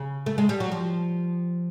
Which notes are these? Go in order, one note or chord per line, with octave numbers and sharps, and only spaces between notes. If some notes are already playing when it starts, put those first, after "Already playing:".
Already playing: C#3
A3
G#3
G3
F#3
F3